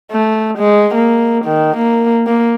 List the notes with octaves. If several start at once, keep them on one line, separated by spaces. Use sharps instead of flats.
A3
G#3
A#3
D#3
A#3
A#3